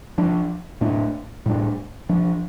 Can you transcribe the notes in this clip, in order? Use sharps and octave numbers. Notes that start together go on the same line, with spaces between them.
F3 D4
A2 A3 D4
A2 G3 D4
F3 D4